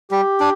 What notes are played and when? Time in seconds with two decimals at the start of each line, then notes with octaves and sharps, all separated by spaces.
0.11 G3 G4
0.40 D4